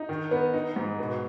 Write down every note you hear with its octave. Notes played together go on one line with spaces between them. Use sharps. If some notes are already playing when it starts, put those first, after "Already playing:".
Already playing: D#4
D#3
B3
D#4
G#2
B2